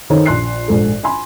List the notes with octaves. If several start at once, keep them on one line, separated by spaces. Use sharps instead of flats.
D#3 D#4 A4 C5 C#5
A#1 C6 F#6 C7
A#1 G#2 A4
G#5 B5 C6